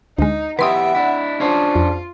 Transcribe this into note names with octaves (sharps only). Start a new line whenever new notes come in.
D2 G#3 D#4
E3 B3 G4 B4 E5 F#5 C6 D#6
D4 E4
C#4 D4 F4 G#4 C5
F2